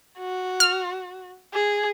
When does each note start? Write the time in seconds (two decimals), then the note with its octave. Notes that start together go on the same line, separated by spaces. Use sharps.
0.18 F#4
0.60 F6
1.54 G#4